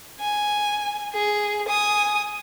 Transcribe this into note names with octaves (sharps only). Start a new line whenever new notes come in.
G#5
G#4
G#5 D#6